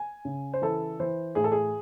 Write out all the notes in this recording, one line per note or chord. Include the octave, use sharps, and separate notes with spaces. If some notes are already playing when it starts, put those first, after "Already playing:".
Already playing: G#5
C#3
C5
E3 A4
E3 C5
A2 G#4
A4
G#4